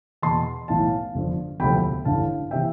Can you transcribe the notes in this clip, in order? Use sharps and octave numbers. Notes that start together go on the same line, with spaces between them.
E2 B2 A5 C6
B1 A2 E3 F5 A5
G1 G2 F3
E1 D2 C3 F3 G5 B5
A1 G2 D3 F5 A5
C3 E3 E5 G5